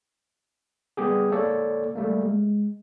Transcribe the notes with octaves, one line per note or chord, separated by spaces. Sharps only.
G3 B3 G4 G#4
A#3 A4 C#5 D5
G3 A3 A#3
G#3